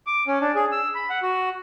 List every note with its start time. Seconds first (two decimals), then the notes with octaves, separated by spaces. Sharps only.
0.07 D6
0.27 C#4
0.41 D4
0.55 G#4
0.72 E6
0.95 B5
1.10 F#5
1.23 F#4